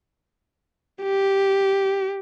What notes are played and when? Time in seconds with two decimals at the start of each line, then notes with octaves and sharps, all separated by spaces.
1.02 G4